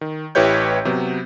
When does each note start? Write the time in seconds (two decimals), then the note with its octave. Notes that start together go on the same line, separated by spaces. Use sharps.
0.01 D#3
0.35 A1 E4 G4 B4 C#5 G6
0.85 C3 F#3 B3